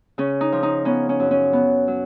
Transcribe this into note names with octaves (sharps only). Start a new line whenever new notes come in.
C#3 C#4
D#4
F3
D#4
B3 C#4
C#4
F#2
C#4
B3
F#3